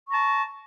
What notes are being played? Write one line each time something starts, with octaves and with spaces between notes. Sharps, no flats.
A5 A#5 C#6